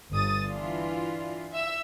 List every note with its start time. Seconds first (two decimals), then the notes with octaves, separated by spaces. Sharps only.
0.11 G1 D#6 A6
0.45 E3 D4 F4
1.52 E5 E6